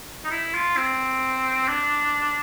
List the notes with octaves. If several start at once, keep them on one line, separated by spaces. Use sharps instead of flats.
D#4
E4
F4
C4
D4